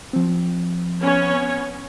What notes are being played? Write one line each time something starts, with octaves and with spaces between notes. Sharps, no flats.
F3 C4
B3 C#4 C#5